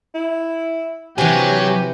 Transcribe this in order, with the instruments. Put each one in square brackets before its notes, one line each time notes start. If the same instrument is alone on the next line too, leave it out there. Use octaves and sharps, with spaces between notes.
[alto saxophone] E4
[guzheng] C3 E3 [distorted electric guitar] F#3 [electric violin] G4 [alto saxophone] G#5